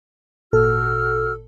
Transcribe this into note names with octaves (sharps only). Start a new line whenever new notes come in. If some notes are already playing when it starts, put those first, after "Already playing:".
G#1 A#2 F#4 A4 E6 F6